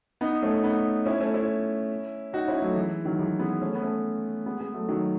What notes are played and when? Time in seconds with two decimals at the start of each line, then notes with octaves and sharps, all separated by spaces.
0.21 B3 D#4
0.42 A3 C#4
0.64 B3 D#4
1.06 C#4 E4
1.20 A3 C#4
1.34 C#4 E4
2.33 D#4 F#4
2.48 C#4 E4
2.62 F#3 A3
2.76 E3 G#3
3.05 D#3 F#3
3.19 E3 G#3
3.39 G#3 B3
3.61 A3 C#4
3.75 B3
3.82 A3 C#4
4.46 G#3 B3
4.60 G#3 B3
4.74 F#3 A3
4.89 D#3 F#3